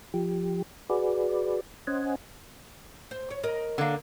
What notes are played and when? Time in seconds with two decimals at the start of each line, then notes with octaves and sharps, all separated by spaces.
0.14 F3 G4
0.90 F#4 G#4 B4 D5
1.87 C#4 C5 D#5 F#5 G#5
3.11 C5
3.30 C#5
3.44 A#4 D#5
3.78 D3 A#3